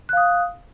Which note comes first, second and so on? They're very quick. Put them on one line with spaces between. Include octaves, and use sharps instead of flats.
F#6 F5 D#6